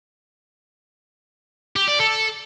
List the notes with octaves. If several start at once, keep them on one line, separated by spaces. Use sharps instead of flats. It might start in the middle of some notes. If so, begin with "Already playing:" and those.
G4
D5
A4